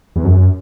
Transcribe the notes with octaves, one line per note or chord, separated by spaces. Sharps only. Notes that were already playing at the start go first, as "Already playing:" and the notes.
E2
F#2